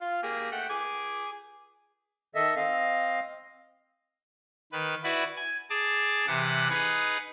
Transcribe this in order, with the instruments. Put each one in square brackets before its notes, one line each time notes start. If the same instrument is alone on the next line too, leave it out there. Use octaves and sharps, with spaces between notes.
[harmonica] F4 F5
A#3 G4 G#4
A3 F#5 G5
G#4 G#5 D6
[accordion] D#3 A4 D#5 E5
C4 D#5 F5
[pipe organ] D#3 B4
E4 F#4 B4 D5
G#5
G#4 A5 D6
C3 E3 F#5 D6 F#6
D#4 G#4 B4 F#5